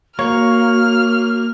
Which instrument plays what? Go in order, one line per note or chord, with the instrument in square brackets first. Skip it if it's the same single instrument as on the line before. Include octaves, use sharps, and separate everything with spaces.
[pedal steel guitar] A#3 [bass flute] F#4 [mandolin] C#5 [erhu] F6